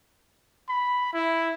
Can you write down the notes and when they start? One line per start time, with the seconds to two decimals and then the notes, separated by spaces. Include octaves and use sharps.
0.69 B5
1.13 E4